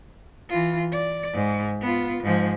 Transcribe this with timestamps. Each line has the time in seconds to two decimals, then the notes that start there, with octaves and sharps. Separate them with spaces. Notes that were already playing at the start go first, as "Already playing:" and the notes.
0.50 E3 F4
0.92 D5
1.33 G#2
1.81 B3 F4
2.23 G#2 F3